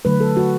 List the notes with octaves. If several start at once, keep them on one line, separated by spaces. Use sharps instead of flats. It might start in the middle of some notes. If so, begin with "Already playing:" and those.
D3 F#3 A3 B4
A4
F#4